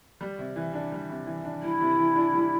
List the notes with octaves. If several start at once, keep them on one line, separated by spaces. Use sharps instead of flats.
G3
C3
E3
D4
G3
C3
E3
D4
G3 E4
C3
E3
D4
G3